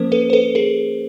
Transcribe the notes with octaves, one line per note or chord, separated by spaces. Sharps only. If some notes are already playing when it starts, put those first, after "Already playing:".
Already playing: F3 A#3 C#4 A#4 C5
A4 B4
C5
A4 B4
G#4 A#4